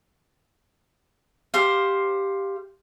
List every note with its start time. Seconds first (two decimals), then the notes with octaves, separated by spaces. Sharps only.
1.54 G4 C5 F5